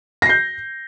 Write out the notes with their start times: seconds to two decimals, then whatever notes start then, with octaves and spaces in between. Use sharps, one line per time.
0.22 A#6
0.26 C7
0.29 G6